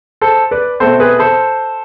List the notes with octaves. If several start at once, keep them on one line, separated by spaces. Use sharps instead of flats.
A4 C5
B4 D5
B2 A3 C4 A4 C5
G#4 B4
A4 C5